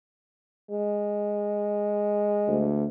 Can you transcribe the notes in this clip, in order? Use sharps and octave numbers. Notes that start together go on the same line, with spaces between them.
G#3
D2